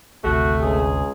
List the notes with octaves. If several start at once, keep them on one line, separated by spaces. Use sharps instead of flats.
G#1 D2 C3 A3 F#4 G4
C#2 G#4